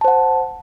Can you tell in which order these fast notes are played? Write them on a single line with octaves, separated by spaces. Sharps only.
A5 C5 F#5